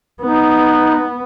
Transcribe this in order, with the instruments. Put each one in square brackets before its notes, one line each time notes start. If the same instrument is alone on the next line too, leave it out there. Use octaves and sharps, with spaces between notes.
[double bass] B3 [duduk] D#4